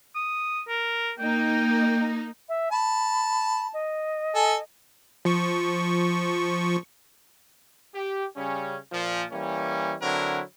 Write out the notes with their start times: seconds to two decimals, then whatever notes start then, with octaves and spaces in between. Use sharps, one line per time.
0.15 D#6
0.68 A#4
1.19 A#3 D#4 G5
2.49 E5
2.72 A5 B5
3.74 D#5
4.35 A4 G#5
5.25 F3 C#6
7.94 G4
8.37 C#3 G3 C#4
8.92 A#2 F3
9.32 E3 G3 A#3 C#4
10.02 D3 F#3 C4 E4 A#4